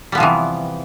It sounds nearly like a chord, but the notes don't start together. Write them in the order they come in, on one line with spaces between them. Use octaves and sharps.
G3 B3 F3 C3 E3